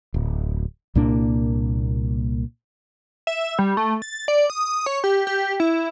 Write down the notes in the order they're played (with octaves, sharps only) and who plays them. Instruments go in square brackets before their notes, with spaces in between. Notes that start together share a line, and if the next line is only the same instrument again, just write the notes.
[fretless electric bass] D1
C2 A#2 A#3 D4
[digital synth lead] E5
G3
A3
A6
D5
D#6
C#5
G4
G4
E4